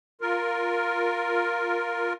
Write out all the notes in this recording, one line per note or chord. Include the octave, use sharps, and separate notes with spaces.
F4 A#4